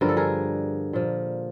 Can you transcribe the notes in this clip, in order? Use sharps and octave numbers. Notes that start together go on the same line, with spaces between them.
G2 D3 F3 A#4
A4
G#4 A#4
A#2 F3